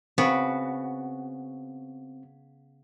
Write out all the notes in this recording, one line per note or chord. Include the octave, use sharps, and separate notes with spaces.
C#3 B3 C4 F#4